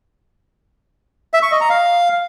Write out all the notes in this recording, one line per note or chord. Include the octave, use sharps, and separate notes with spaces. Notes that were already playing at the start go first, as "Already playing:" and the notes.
E5
C#6
D#5
A#5
F5